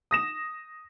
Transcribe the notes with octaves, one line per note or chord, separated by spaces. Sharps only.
D#6 A#6 E7